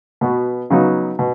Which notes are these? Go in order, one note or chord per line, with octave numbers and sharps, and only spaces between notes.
B2 B3 F#4
C#3 F#3 B3 D#4 F#4
B2